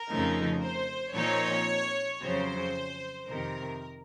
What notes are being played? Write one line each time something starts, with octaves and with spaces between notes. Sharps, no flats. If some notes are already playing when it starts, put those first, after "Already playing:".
Already playing: A#4
F2 C#3 F3 A3 D#4
C5
A#2 F3 C4 D#4 C#5
F2 C#3 F#3 C5
F2 C3 D#3 A#4